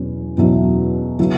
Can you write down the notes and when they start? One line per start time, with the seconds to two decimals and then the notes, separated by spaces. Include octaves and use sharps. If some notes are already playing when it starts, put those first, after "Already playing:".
Already playing: E2 B2 F#3 C#4 E4
0.38 E2 B2 F#3 C#4 E4
1.19 C#3 F#3 B3 E4